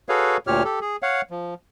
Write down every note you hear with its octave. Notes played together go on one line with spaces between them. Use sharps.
F#4 G#4 A4 B4 C#5 F5
D2 A#2 G4 C#5 F6
G4 A4
G#4
C#5 F5 F#5
F3